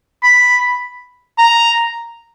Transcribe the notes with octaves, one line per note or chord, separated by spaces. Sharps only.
B5
A#5